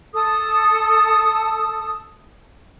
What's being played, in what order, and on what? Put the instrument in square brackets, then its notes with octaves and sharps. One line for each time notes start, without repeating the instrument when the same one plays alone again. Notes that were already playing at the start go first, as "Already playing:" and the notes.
[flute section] A4 A5 D#6